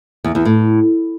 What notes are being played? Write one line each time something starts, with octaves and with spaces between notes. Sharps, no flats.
E2
E2
A2